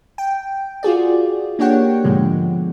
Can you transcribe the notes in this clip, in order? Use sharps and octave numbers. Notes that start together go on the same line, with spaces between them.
G5
F4 F#4 G#4 D5
A#3 D4 G4 C#5 F#5 G5
G#2 B2 D3 F3 G#3